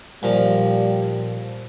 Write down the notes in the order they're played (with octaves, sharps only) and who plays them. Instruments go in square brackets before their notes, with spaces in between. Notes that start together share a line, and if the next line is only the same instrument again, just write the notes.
[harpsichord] A#2 F3 [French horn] G3